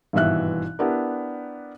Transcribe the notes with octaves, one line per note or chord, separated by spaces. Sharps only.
G#1 G2 B2 E3 E5 F#6
B3 D4 E4 G4 A#4